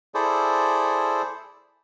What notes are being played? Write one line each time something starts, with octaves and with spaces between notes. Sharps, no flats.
E4 G#4 A4 C5 D5